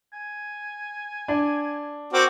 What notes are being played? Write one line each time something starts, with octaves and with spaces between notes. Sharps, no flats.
G#5
D4
C4 F#4 A#4 D6